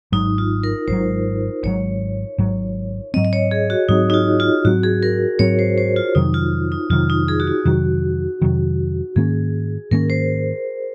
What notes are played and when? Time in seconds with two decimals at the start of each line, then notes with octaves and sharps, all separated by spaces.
0.12 G#1 G#2 F#3 D#4
0.38 F4
0.63 A#4
0.87 G#1 G#2 F#3 C5
1.63 G#1 G#2 F#3 C#5
2.38 G#1 G#2 F#3
3.14 G#2 F#3 C4 D#5
3.25 D#5
3.33 C#5
3.51 G#4
3.70 F#4
3.89 G#2 F#3 C4 D#4
4.10 D#4
4.14 F4
4.40 F4
4.65 G#2 F#3 C4 F#4
4.84 G#4
5.03 A#4
5.39 G#2 F#3 C4 C#5
5.59 C5
5.78 C5
5.96 F4
6.15 F2 C3 D#3 F#3 D#4
6.34 F4
6.72 D#4
6.90 F2 C3 D#3 F#3 F4
7.10 D#4
7.28 G#4
7.40 F#4
7.47 F4
7.65 F2 C3 D#3 F#3 F#4
8.41 F2 C3 D#3 F#3
9.16 G#2 D#3 A#3 C#4 G#4
9.91 G#2 D#3 A#3 C#4 A#4
10.10 C5